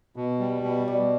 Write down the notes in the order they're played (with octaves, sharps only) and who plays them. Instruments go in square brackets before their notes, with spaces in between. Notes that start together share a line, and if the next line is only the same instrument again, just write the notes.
[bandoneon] B2
G3
B2
[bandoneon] B2 [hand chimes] D5